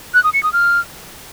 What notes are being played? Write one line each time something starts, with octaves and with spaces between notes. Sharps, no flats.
F#6
D#6
C#7
D#6
F6